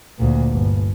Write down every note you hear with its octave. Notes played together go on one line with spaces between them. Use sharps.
D2 A#2
G1